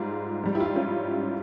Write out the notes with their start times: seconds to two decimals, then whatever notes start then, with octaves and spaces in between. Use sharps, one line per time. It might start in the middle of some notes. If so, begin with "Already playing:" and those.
Already playing: G#2 G3 F4 G#4
0.44 G#2 G3
0.55 E4 G4
0.60 F4
0.65 E4 G4
0.76 C#4 F4